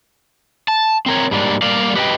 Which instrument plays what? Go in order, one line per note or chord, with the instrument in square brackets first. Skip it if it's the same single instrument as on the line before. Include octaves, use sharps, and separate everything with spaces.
[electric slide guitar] A5
C4 A#4 C#5
G#2 G3 A#3 D4
G3 A#3 D5 F5
G4 B4 D#5 F#5 G5